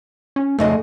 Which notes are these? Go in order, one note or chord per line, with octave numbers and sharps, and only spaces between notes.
C#4
F2 C#3 A3 D#5